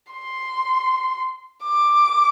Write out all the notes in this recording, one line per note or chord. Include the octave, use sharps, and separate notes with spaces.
C6
D6